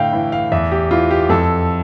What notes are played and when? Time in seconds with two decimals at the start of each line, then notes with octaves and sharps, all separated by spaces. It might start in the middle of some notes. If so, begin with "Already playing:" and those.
Already playing: A2 D3 F5 G5
0.13 E3
0.32 F5
0.52 E2 E5
0.72 G4
0.91 E3 F4
1.11 G4
1.29 F2 A4